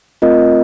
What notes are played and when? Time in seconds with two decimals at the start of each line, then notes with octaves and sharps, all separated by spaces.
0.22 A3 C4 F4 A#4 D#5